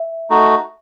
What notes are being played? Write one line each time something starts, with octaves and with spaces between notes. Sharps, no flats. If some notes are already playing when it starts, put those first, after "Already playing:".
Already playing: E5
A3 D#4 F#4